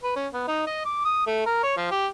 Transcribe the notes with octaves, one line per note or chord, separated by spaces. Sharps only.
B4
C#4
B3
D#4
D#5
D6
D#6
A3
A#4
C#5
F3
G4